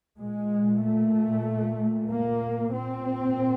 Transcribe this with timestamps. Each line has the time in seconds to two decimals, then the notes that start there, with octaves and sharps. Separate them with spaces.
0.20 A#2 G#3
0.83 A3
2.10 A#3
2.73 A#2 C4